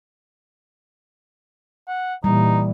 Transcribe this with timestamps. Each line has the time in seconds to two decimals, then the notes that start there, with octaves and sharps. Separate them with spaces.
1.88 F#5
2.24 A#2 E3 G3 D#4